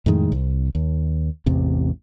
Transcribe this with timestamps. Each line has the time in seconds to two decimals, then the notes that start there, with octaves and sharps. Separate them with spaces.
0.06 F2 A2 D#3 G#3
0.32 C2
0.75 D#2
1.46 A1 E2 C3